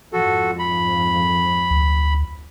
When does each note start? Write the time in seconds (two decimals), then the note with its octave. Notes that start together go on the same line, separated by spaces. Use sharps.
0.13 F2 G#2 F3 F#4 A4
0.59 B5
1.71 D2